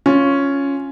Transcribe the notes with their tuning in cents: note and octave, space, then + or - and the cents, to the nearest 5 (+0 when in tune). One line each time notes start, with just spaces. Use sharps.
C#4 +0 F4 +0